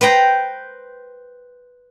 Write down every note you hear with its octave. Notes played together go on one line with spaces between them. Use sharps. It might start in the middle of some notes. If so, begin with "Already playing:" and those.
B4 C5 G5 A#5